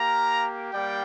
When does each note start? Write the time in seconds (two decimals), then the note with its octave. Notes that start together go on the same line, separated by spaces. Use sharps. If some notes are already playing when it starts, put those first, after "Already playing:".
Already playing: A#3 G4 F5 A#5
0.73 G3 A#3 G4 D5 G5